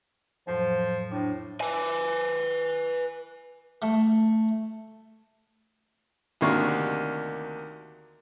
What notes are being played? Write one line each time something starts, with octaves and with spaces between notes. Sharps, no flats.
F2 A2 F3 F#3
A2 D4
B4 G#5
A3
D2 C3 D#3 A#3 D4 C#6